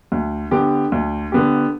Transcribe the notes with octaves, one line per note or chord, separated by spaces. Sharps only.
D2
D3 B3 G4
D2
D3 B3 G4